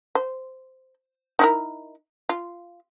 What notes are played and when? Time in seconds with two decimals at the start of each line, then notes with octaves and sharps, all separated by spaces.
0.15 C5
1.39 D#4 E4 A#4
2.29 F4